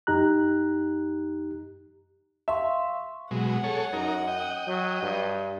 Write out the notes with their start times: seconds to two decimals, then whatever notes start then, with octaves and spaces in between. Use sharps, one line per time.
0.07 F#2 D#4 G4 A#5 F#6
2.48 E5 F5 C6 C#6
3.31 B2 F#3 G#3 F#5
3.64 G#4 A4 C#5
3.93 F#2 D#4 A#4
4.28 D#5 G5
4.67 F#3
5.03 G2